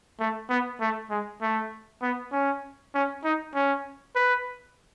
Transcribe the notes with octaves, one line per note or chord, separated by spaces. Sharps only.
A3
B3
A3
G#3
A3
B3
C#4
C#4
D#4
C#4
B4